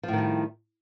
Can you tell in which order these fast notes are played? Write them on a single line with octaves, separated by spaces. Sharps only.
F3 A2 D#3 G3